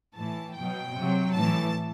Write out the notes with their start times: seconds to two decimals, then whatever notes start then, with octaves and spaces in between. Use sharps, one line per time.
0.15 A2 E3 A5
0.55 B2 F#3 G5
0.95 C3 F#3
1.34 A2 E3 A5